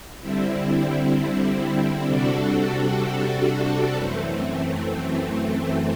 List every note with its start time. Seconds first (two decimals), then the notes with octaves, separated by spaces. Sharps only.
0.21 D3 G3 C4 E4
2.07 C3 G3 D4 F#4 A4
3.95 F#2 E3 A3 C4